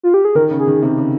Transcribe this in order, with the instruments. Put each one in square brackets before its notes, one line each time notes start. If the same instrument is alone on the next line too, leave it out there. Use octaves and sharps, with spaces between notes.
[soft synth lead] F4
G4
G#4
[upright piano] D#3 [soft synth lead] A#4
[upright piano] C#3
[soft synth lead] G#4
[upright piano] D#3
C3
C#3